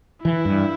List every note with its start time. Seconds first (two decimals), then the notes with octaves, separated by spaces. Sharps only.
0.24 E3 E4
0.45 G2